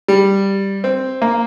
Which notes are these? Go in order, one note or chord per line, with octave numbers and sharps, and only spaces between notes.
G3
C4
A#3